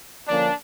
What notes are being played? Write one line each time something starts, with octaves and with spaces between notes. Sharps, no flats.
D3 F3 A#3 C#4 D4